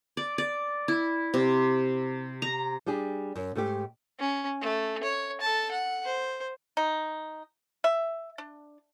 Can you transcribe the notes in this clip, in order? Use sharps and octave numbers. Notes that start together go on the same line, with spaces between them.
D5
D5
E4
C3
A#5
G3 D4 G4 G#4
F#2
G#2 A3 G4
C#4
A3
C#5
A4 A5
F#5
C5
D#4
E5
D4